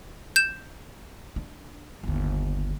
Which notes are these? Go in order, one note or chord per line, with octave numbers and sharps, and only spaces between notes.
G6 E7
D4
G1 D#2